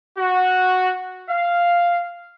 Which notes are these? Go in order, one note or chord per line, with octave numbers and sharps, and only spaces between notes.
F#4
F5